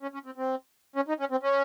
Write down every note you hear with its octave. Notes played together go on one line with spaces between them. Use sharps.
C#4
C#4
C4
C4
C#4
D#4
C#4
C4
C#4